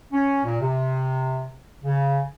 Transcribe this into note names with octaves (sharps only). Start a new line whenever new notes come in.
C#4
A#2
C3
C#3